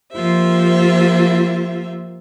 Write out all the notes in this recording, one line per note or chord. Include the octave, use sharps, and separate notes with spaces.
F3 A#3 F4 G4 C5 E5